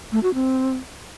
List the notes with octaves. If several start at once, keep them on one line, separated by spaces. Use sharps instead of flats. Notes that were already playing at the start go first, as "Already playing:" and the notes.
A3
F#4
C4